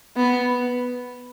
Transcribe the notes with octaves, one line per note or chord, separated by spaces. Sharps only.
B3